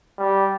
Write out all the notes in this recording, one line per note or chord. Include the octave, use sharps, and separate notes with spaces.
G3